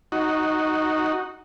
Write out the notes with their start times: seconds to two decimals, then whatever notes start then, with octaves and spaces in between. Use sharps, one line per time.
0.12 D#4 F#4